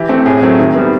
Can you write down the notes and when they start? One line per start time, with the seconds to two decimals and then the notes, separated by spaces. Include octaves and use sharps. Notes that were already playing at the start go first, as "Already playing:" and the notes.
Already playing: E3 G4
0.09 A3 C4
0.26 A2 G#4
0.42 F#3 A3 C4
0.59 D#3
0.75 G3 B3